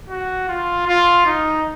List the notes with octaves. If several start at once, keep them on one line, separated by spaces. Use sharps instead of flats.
F#4
F4
F4
D#4